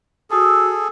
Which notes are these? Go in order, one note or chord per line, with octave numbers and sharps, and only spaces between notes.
F#4 G#4 A4 D#6 E6